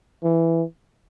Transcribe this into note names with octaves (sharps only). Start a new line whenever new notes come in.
E3